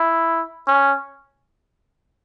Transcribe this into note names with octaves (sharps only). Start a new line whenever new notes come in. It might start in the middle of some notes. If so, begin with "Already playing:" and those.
Already playing: E4
C#4